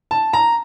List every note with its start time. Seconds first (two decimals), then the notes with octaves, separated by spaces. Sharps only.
0.11 A5
0.33 A#5